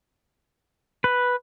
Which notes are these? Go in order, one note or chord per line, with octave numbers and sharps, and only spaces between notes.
B4